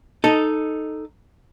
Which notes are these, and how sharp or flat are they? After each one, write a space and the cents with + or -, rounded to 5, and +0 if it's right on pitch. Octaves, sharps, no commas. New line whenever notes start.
D#4 -5 A4 +0 D#5 +0